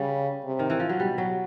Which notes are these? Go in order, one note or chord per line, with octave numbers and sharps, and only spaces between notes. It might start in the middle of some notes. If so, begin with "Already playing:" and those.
Already playing: C#3 G3
C3
D#3
E3
F3
F#3
B2 G3
F#3